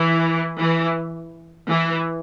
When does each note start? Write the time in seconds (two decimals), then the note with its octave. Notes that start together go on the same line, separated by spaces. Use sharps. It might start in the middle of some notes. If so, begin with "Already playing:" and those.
Already playing: E3
0.60 E3
1.68 E3